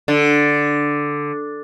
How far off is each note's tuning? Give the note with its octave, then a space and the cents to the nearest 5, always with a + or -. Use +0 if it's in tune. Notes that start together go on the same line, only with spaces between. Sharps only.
D3 +0